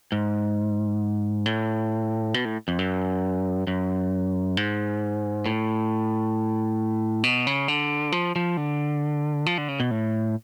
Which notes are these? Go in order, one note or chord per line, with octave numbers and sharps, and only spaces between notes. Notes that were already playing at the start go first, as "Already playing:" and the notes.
G#2
A2
B2
A2
F2
F#2
F#2
G#2
A2
B2
C#3
D3
F3
F3
D3
F3
D3
C#3
B2
A2